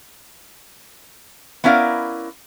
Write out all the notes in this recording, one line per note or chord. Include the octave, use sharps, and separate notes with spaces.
B3 C#4 E4 A#4 D5 F5